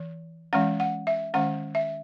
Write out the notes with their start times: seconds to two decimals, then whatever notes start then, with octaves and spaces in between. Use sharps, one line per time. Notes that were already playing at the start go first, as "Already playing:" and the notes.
Already playing: E3
0.53 E3 G#3 C#4 F#5
0.80 F#5
1.07 E5
1.34 D#3 G#3 C#4 F#5
1.75 E5